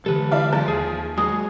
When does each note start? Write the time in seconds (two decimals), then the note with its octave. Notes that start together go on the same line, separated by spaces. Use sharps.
0.06 D3 E3 G#3 G4 A4 B4
0.31 E4 D5 F5
0.52 F3 A5
0.68 D#2 G#4
1.18 F#3 G#3 G#4 D#6